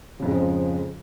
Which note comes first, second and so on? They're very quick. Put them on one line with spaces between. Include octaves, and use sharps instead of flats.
C#3 F2 G#2 G#3 F3